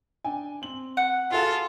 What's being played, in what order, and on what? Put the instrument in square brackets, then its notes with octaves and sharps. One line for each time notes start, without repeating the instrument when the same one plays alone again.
[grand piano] D4 G5 G#5
C4 F#7
[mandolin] F#5
[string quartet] F4 A4 [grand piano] F#4 G#4 F5